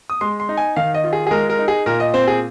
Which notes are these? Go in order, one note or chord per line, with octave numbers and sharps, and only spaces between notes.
D#6
G#3 C6
C6
D#4
G#5
D#3 F5
D#5
F4
G#4
G#4
G#3 A#4
A#4
D#4
G#4
A#2 A#4
D#5
C4 C5
G#4